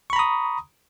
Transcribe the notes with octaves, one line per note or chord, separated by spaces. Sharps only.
A#5 B5 C#6 D#6